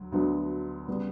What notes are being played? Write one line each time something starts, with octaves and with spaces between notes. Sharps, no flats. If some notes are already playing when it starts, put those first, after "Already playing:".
Already playing: D2 F#3
D2 D3 F#3 B3
C#3 G3 B3